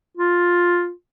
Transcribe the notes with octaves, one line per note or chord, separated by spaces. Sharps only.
F4